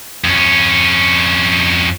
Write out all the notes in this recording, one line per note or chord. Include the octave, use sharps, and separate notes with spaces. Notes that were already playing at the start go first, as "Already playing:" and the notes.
F2 C#4